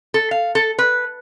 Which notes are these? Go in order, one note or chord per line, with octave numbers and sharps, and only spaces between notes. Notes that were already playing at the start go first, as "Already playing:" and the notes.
A4
F5
A4
B4